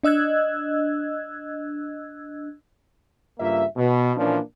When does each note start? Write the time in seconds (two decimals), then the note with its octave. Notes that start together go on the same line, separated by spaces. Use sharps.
0.03 D4 D#5 E6 F#6 G#6
3.40 G2 C#3 A#3 F4 E5
3.76 B2
4.17 A#2 E3 F3 A#3 C#4 D4